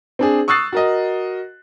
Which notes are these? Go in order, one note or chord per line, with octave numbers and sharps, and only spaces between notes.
C4 D4 G#4
C#6 D#6 E6 F#6 A6 C7
F#4 A#4 D#5